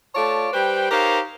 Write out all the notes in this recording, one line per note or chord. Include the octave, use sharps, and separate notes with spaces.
A3 F4 C#5 D5 A5
G3 B4 C5 G5
D#4 G4 A#4 C5 C#5 F5